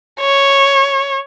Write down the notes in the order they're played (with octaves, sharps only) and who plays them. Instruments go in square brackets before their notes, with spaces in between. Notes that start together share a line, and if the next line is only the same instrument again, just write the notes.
[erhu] C#5